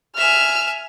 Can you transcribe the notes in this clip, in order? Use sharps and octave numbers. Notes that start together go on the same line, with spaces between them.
E5 G#5 F6